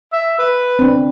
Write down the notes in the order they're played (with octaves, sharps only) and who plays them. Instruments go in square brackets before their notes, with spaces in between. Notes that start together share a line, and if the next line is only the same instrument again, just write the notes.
[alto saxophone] E5
B4
[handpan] C4 D4